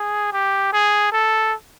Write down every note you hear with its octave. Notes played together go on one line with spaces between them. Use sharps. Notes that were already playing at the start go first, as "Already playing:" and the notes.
Already playing: G#4
G4
G#4
A4